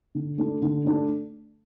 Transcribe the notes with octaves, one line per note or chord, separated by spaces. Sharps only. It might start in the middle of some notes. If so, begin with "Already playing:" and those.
D3
A3 D4
D3
A3 D4